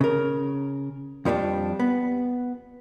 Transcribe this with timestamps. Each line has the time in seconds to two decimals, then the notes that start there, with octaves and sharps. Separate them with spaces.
0.01 C#3 A#4
1.25 F2 F3 G3 C#4 D4
1.79 B3